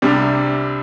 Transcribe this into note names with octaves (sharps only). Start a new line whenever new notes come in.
C2 C3 G3 D4